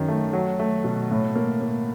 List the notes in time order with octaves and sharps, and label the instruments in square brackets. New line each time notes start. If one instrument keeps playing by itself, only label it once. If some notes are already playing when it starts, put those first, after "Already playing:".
Already playing: [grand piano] F#2 D#3
A3
F#3
A3
B2
A2
A#3
A#3